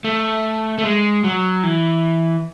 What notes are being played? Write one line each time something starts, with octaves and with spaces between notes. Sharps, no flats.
A3
A3
G#3
F#3
E3